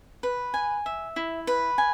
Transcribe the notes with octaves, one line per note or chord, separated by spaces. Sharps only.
B4
G#5
E5
E4
B4
G#5